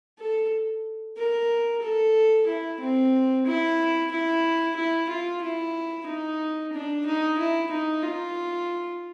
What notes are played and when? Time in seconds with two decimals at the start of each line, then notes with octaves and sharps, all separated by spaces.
0.19 A4
1.17 A#4
1.82 A4
2.47 E4
2.80 C4
3.46 E4
4.11 E4
4.76 E4
5.09 F4
5.42 E4
6.07 D#4
6.72 D4
7.06 D#4
7.38 E4
7.71 D#4
8.03 F4